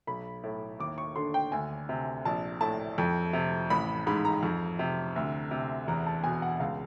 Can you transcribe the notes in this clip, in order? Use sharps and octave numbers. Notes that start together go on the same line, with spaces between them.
B1 B5
A2
D#2 D6
C#6
D3 C6
G5
D2 G#5
C3
A#1 A5
A2 A5
F2
C3
A1 B5
G#2 B5
A#5
F2
C3
D2
C3
E2 A#5
A5
B2 G#5
F#5
C#2 F5